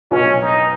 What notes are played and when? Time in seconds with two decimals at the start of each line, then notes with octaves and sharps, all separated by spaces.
0.11 B1 B2 C#4
0.26 B1 B2
0.41 D#4